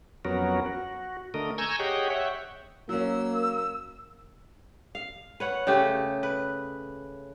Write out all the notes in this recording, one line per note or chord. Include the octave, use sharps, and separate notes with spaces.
F2 F#3 B3 C#4 F#4 A#4
F#4
D3 A3 A#4 D#5
G#5 A#5 C#6 E6 G6 G#6
G4 G#4 C#5 D#5 F#5 G5
C#5 E5 F#5 G5
F#3 A#3 C#4 E6
F5
B4 C#5 F#5
C#3 A3 G4
B4